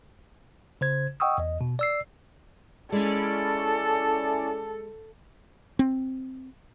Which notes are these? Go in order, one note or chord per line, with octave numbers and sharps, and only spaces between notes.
C#3 C5 G#6
D#5 F#5 G5 C#6 D#6 E6
E2 D#5
B2
D5 E6 C7
G#3 C#4 E4 A4 D5
C4